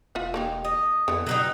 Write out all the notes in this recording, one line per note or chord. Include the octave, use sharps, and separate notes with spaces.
E1 F4 E5 F#5
A#3 D#4 G4
D#5
F2 D3 E3 B3
B2 F#3 G3 D#4